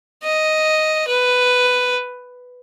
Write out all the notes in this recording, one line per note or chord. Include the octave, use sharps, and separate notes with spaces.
D#5
B4